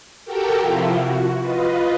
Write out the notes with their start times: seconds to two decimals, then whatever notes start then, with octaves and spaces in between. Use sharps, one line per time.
0.25 F#4 G4 A4 A#4 G5
0.59 C3 F3 E4 F4
0.95 F#4
1.41 F4 B4 D#5